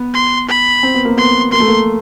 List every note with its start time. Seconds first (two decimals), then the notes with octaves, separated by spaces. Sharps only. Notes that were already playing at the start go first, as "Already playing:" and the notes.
Already playing: B3
0.14 C6
0.49 B5
0.83 C4
0.94 B3
1.05 A#3
1.17 B3 C6
1.52 A#3 C6
1.60 A3
1.68 A#3